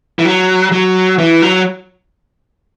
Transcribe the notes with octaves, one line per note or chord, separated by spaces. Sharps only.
E3
F#3
F#3
E3
F#3